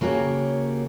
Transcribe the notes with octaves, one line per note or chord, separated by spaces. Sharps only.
C#3 A#3 F#4 G4 C#5